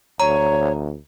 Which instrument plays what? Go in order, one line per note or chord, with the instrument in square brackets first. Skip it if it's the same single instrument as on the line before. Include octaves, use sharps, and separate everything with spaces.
[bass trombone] D2 [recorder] C#5 [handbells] A#5